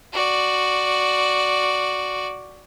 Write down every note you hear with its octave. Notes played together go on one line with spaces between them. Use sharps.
F#4 D5